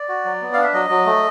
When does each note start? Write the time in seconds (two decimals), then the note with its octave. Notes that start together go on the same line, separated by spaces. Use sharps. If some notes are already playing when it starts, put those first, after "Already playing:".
Already playing: D5
0.09 F#4
0.25 F#3
0.42 B3
0.53 D4 F5
0.64 E5
0.73 F#3 D#5
0.89 F#3
1.06 A3